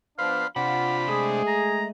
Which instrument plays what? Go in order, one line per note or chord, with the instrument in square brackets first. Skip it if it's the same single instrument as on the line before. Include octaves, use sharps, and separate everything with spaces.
[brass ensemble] F3 B3 D4 [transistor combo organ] B4 C5 [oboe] F5
[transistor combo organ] C3 D4 [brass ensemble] F4 [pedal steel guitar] F#5 [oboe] B5
[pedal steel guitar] G#3 A3 D#6 [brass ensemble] G#4
[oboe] A#5